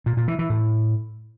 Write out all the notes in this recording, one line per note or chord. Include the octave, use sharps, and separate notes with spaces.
A#2
A#2
E3
E3
A2